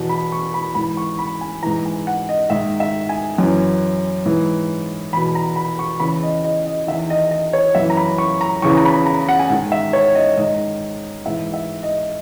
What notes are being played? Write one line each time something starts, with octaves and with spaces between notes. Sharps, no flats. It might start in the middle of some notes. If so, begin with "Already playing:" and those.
Already playing: E2 B2
B5
C#6
B5
G#2 E3 B5
C#6
B5
G#5
G#2 E3 A#5
G#5
F#5
D#5
G#2 D#3 E5
E5
G#5
F#2 E3
G#2 E3
E2 B2 B5
A#5
B5
C#6
E2 C#3 E3 B5
D#5
D#5
D#5
D#3 E5
E2
D#5
D#5
C#5
F#2 E3 E5
A#5
B5
C#6
A#5
E2 C#3 E3 C#6
A#5
B5
A#5
F#5
G#5
G#2 D#3 F#5
E5
C#5
D#5
G#2 D#3 D#5
G#2 E3 E5
E5
D#5